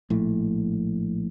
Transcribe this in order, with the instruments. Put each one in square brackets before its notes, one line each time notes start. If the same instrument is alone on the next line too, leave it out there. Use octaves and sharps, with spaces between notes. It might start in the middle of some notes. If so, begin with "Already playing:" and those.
[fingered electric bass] A#1 A2